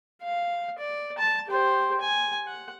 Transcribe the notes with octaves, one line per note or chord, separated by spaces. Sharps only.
F5
D5
A5
G4 C5
G#5
F#5